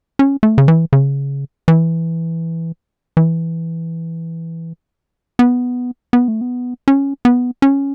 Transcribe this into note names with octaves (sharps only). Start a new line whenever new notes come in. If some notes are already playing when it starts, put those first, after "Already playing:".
C#4
A3
C#3
E3
C#3
E3
E3
B3
B3
A3
B3
C#4
B3
C#4